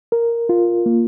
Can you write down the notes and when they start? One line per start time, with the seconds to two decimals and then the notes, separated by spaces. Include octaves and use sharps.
0.12 A#4
0.49 F4
0.86 A#3